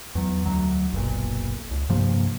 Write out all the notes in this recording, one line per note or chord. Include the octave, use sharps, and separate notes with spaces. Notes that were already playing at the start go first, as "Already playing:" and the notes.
E2 F#3
D2 F#3
F#1 B1 A#2
C#2
G2 C3 F3 A#3